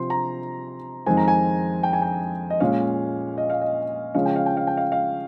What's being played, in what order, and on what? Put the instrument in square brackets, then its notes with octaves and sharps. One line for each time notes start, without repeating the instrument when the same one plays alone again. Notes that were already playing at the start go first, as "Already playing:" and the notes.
Already playing: [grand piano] C3 F3 C4 C6
A#5
F2 D#3 G#3 C4 G#5
A#5
G#5
G5
G#5
G5
D#5
A#2 G#3 C#4 F5
D#5
F5
D#5
C#3 F3 G#3 C#4 F5
G5
F5
G5
F5
G5
F5
F5